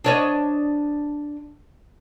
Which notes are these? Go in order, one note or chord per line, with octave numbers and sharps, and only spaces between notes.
D4 C#5 D#5